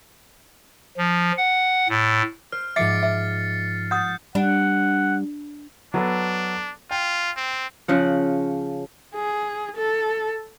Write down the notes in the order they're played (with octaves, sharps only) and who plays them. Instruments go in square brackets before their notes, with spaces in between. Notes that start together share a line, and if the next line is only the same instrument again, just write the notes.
[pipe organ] F3
F#5
A2
[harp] C5 [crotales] F6
[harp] G#2 F3 D6 [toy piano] E5 [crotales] A6 C7 C#7
[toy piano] E5
[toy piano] F#5 D#6 [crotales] G6 [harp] A6
[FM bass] G3 [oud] D4 [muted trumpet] F#5
[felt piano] F#3 B3 A4 [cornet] D4
[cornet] F4 [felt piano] G5
[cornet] C4
[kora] C#3 F3 F#5
[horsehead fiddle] G#4
A4